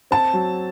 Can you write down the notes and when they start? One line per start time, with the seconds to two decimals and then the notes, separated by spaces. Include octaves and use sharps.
0.11 C4 A5
0.34 F#3